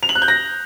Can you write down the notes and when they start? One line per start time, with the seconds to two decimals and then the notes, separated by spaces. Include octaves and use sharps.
0.03 F7
0.09 F#7
0.15 F#6
0.22 G6
0.28 A#6